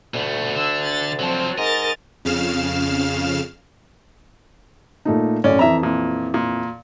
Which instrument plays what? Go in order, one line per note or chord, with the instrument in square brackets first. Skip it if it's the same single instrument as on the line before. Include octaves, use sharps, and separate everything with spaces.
[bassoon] D2 [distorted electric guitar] B2 A3
[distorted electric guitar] D3 [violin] E6
[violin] A6
[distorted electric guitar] F3 F#3 [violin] C4 A5
[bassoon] G#2 [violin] A#4 A6 [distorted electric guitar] D#5
[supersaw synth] F2 C#3 F5 F6 E7
[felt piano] A#2 A3 D#4
[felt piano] F#2 A2 [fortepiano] C#4 D5
[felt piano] F2 E3 [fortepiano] E5 A#5
[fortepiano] A#2
A#2